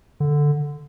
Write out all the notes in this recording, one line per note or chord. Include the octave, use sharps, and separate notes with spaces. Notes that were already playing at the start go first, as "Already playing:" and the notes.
D3